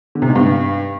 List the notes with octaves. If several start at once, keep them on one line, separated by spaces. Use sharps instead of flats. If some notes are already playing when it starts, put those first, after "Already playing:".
D3
C3
G#2
G2